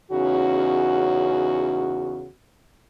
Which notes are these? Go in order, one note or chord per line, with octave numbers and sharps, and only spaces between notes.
E2 C#3 C#4 D#4 F#4